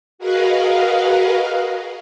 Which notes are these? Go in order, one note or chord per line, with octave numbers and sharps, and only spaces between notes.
F#4 G#4 A#4 B4 D#5 F5